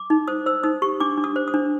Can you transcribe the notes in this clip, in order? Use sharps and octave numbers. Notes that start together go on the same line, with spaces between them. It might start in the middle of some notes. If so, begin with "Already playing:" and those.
Already playing: D6
D#4
C5 D#6
C5 E6
D#4 D#6
G4 C#6
D4 D6
D4
D#6
C5
D#6
D4